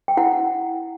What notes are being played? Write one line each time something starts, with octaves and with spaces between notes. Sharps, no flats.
G5
E4 F#5